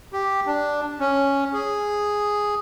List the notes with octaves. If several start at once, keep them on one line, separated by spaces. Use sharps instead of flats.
G4
D4
C#4
G#4